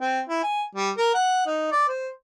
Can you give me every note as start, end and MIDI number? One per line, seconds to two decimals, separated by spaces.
0.01 0.21 60
0.29 0.42 64
0.43 0.64 80
0.75 0.90 55
0.97 1.11 70
1.14 1.44 78
1.46 1.71 63
1.72 1.86 74
1.88 2.10 72